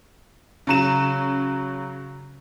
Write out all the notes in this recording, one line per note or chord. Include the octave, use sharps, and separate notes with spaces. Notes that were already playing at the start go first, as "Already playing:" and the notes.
C#3 F#3 E7